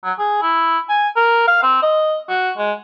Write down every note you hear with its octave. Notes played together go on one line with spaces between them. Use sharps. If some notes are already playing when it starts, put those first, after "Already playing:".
F#3
G#4
E4
G#5
A#4
F5
C4
D#5
F#4
G#3